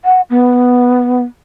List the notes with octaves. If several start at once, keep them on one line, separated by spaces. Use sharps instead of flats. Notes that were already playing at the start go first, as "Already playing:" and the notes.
F#5
B3